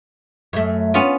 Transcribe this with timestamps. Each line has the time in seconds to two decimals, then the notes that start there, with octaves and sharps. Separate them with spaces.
0.53 F#2 A3
0.94 B3 C#4 F4